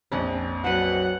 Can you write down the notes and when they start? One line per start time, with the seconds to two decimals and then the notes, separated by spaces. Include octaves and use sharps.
0.12 A#1 F2 C#4 D#5 F#5
0.64 F#3 B4 C5 F#5